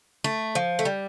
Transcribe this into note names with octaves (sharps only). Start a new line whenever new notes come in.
A3
F3
A3
G3